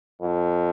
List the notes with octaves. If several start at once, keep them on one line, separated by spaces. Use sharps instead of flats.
F2